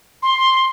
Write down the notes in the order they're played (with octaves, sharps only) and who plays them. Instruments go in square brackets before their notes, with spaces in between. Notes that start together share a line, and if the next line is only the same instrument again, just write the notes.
[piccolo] C6